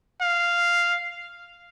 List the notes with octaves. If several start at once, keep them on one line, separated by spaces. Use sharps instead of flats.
F5